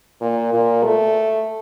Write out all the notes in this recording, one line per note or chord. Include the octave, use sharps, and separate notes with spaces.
A#2
A#2
A3